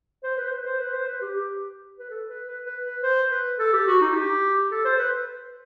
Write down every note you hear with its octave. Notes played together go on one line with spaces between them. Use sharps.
C5
B4
C5
B4
C5
B4
C5
B4
G4
G4
B4
A4
B4
B4
B4
B4
C5
B4
A4
G4
F#4
D#4
G4
A4
C5
B4